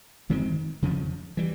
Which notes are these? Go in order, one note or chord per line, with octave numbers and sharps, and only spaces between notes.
F#2 D#3 G#3 C4
F2 C#3 F3
E3 G3